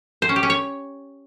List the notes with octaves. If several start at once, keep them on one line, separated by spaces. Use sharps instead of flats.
C5
C#4
G4
C#4
C#5